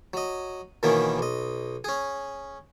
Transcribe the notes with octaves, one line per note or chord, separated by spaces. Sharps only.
F#3 D#5
B2 D#3 E3 A#3 B3 C#4
B1 D#5
C#4 G#4